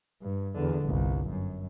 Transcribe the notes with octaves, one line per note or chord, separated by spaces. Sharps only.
G2
E2 D3
G1 C2
F#2